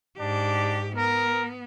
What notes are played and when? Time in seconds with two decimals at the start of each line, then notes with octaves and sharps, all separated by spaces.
0.19 G#2 D4 G4
0.97 B3 A#4